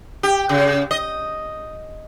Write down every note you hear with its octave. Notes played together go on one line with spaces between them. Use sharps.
G4
C#3
D#5